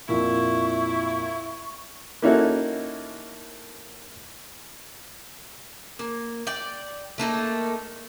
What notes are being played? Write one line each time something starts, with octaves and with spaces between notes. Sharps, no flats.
F2 A#2 E4 C#6
A#3 C#4 D#4 E4 F#4 A4
A#3
D5 G5
A3 A#3 D#4 A4